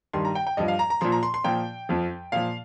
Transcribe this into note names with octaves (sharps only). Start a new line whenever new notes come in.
G2 D#3 G3 C6
A#5
G5
G5
G2 F3 D#5
F5
A#5
A#5
A#2 F3 C6
A#5
C6
C6
A#2 F3 G5
F2 F3
A#2 F3 F5